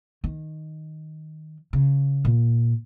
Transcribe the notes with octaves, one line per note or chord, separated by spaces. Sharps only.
D#3
C#3
A#2